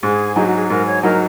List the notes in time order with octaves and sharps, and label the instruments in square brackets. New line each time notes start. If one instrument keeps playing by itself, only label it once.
[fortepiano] G#2 [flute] G#4
[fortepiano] F#3 D#4 [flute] G#4
[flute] F#4
G#4
[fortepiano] G#2 [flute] A#4
[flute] C#5
[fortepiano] F#3 D#4 [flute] A#4